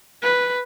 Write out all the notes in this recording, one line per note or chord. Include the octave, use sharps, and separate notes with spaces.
B4